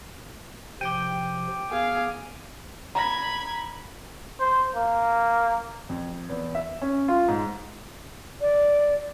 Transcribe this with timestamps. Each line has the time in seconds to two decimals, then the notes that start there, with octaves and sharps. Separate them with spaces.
0.81 C3 F3 G5 D6 G6 D7 D#7
1.71 B3 G#4 F5
2.95 A#5 B5 G#6 A#6
4.40 C5
4.75 A#3
5.89 F2
6.29 E2
6.55 E5
6.82 C#4
7.08 F4
7.28 G#2
8.41 D5